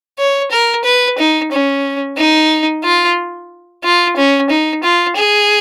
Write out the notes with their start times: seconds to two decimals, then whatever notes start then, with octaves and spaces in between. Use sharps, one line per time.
0.19 C#5
0.51 A#4
0.85 B4
1.19 D#4
1.52 C#4
2.18 D#4
2.84 F4
3.84 F4
4.17 C#4
4.50 D#4
4.84 F4
5.17 G#4